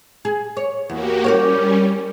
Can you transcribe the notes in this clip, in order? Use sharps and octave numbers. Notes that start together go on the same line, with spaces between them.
G#4
C#5
E2 A#3 F#4 G4
G3 C#4 G4 A#4 C#5